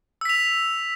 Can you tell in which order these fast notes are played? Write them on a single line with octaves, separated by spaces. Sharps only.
E6 B6 F7